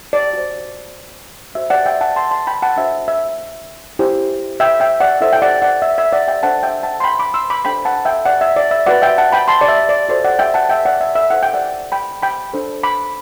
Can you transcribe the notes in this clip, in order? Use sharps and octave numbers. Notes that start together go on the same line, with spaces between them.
D5
F#4 C5
F#4 C5 E5
D5 F#5
E5 G5
F#5 A5
A5 C6
A5 C6
G5 B5
F#5 A5
D4 F#4 C5 E5
E5
E4 G4 C5
E5 G5
E5 G5
D5 F#5
E4 A4 C5 E5
G5
D5 F#5
D5 F#5
E5
E5
D5 F#5
E5 G5
D4 A4 C5 F#5 A5
E5 G5
F#5 A5
C6
G5 B5
B5 D6
C6 E6
B5 D6
D4 A4 C5 G5 B5
F#5 A5
E5 G5
D5 F#5
E5
D5
E5
F#4 B4 D5 F#5
E5 G5
F#5 A5
G5 B5
A5 C6
D5
E5
D5
F#4 A4 C5 D5
D5 F#5
E5 G5
F#5 A5
E5 G5
D5 F#5
E5
E5
E4 A4 C5 F#5
G5
D5 F#5
G5 B5
G5 B5
D4 A4 C5
B5 D6